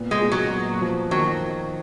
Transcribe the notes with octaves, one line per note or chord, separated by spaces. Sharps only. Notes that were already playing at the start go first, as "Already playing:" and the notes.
Already playing: A#2 B3
G#3
A#2
F#3
B3
F3
D#3 F#3